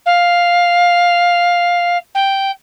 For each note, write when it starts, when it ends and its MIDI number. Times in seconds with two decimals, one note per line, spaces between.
0.06 1.97 77
2.14 2.51 79